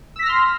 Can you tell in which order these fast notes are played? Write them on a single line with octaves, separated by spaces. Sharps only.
E6 B6 A#6 F6 C6